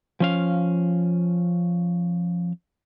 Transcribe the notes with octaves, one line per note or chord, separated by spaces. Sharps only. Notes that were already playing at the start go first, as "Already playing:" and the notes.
F3 C#4 F5